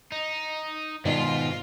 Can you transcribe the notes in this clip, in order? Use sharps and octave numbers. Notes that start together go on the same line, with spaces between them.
D#4
G#2 B2 D#3 F4 D5